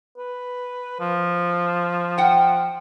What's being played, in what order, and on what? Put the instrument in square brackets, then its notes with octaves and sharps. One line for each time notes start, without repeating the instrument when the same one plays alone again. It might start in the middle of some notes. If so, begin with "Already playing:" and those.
[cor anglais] B4
F3
[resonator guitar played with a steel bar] F#5 G5